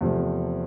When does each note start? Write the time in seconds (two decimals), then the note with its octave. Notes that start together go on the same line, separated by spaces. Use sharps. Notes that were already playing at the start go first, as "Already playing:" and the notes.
0.01 E2 C3 F3 A3